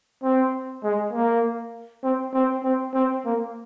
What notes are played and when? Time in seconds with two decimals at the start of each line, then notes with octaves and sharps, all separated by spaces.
0.23 C4
0.84 G#3
1.13 A#3
2.04 C4
2.34 C4
2.64 C4
2.94 C4
3.25 A#3